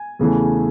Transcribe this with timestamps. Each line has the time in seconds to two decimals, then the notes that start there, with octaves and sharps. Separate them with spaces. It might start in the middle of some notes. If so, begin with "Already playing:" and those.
Already playing: G#5
0.19 E2 C#3 E3 A3